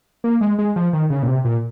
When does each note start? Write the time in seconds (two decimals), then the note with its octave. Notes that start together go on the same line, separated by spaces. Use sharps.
0.24 A#3
0.41 G#3
0.59 G#3
0.76 F3
0.93 D#3
1.10 C#3
1.23 A#2
1.28 C3
1.45 A#2